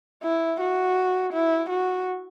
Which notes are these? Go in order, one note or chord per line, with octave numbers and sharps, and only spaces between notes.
E4
F#4
E4
F#4